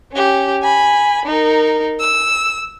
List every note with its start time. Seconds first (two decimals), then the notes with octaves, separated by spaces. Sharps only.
0.12 C#4 G4
0.63 G#5 B5
1.26 D#4 A#4
2.00 E6